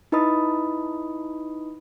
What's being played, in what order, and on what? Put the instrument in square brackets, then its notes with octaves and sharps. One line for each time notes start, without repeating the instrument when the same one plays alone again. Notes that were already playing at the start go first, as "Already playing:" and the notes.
[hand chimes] D#4 E4 B4 D#5 B5 D#6